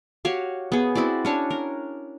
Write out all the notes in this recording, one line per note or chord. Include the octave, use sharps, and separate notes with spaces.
F#4 G4 C#5 F5
B3 G#4
C4 E4 F#4 D5
C#4 D4 C#5
A#4